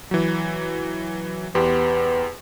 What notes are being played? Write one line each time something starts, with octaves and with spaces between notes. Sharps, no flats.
E3 F#3
E2 B3 G4 C6